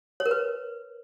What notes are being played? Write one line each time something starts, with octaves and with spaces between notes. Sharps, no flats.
C#5
A#4
B4